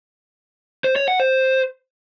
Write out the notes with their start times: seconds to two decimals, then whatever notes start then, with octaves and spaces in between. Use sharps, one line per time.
0.84 C5
0.96 C#5
1.08 F#5
1.20 C5